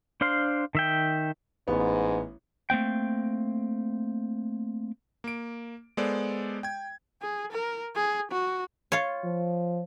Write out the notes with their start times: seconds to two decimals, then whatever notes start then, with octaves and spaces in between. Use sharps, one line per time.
0.21 D4 C5 F5 C6
0.75 D#3 E5 G5
1.68 A1 G#2 B3
2.70 A3 A#3 C4 G5
5.24 A#3 D7
5.97 G#3 B3 A4 C5 D5
6.63 G5 G#6
7.22 G#4
7.52 A#4
7.95 G#4
8.32 F#4
8.92 F4 C#5
9.24 F3